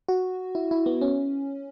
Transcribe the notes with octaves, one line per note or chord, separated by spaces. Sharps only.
F#4
E4
E4
B3
C#4